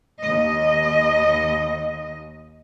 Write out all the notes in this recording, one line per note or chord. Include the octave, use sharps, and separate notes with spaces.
D#2 D#5